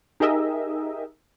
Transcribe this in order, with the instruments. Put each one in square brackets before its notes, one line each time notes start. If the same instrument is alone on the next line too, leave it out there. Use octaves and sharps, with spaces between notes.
[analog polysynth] D#4 G4 G#4 A#4 D#5 E5